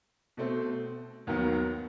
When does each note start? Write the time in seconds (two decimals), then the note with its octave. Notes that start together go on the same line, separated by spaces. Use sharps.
0.37 B2 A3 C4
1.27 D#2 D#3 F#3 B3